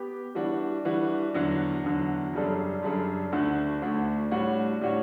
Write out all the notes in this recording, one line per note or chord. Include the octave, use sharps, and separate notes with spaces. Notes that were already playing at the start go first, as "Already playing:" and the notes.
Already playing: B3 G4
E3 G3 D4 F#4
E3 G3 D4 F#4
E2 D3 F#3
E2 D3 F#3
F#2 C#3 G3 D4 A4
F#2 C#3 G3 D4 A4
D2 D3 A3 D4 F#4
D2 D3 A3 D4 F#4
A2 G3 D4 F#4 C#5
A2 G3 D4 F#4 C#5